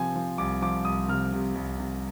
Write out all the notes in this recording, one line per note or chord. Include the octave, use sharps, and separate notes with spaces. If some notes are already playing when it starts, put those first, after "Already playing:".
Already playing: C3 F3 C4 G#5
F3
C2 D6
F3 D6
C2 D#6
C3 F6
C3
C2
C3